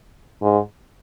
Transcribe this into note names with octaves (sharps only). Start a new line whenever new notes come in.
G#2